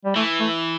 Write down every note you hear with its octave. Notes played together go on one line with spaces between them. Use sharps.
G3
E3 A3
A3